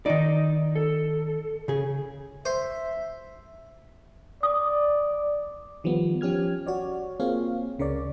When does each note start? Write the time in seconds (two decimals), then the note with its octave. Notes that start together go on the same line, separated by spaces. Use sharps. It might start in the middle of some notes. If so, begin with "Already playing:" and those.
0.06 D#3 D#4 D5 D#5
0.76 A4
1.68 C#3 G#4
2.46 C5 E5
4.43 D5 D#6
5.84 D#3 F3 G3 B3
6.21 F3 C#4 G4 F6 G#6
6.66 F#4 C#5 D5
7.20 A#3 C4 F4 G#4 C#5 F5
7.79 C#2 C#3 A#4 C#5 D5